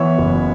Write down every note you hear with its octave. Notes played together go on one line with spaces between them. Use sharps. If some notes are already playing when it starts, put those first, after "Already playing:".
Already playing: E3 B3 C#5 E5
F#1